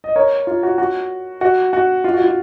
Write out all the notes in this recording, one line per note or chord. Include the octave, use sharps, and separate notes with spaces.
D#5
A#4 C#5
F4
F#4
F#4
F#4
F#4
F4
F#4
F4